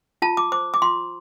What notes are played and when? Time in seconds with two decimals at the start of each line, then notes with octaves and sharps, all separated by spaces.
0.22 F4 A5
0.37 D6
0.52 C5 D6
0.74 D6
0.82 F4 C6